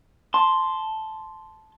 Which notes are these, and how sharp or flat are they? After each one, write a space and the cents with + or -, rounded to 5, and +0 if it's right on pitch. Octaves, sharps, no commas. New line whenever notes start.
A5 -10 C6 +0